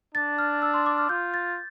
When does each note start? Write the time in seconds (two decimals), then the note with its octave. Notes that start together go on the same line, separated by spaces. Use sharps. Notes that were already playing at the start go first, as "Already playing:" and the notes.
0.14 D4 A6
0.38 F6
0.62 E6
0.74 C6
0.86 D6
0.98 F6
1.09 F4 G6
1.34 A6